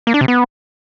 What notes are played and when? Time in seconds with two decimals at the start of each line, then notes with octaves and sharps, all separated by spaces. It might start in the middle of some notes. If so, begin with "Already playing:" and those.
0.07 A#3
0.14 D4
0.21 C3
0.28 B3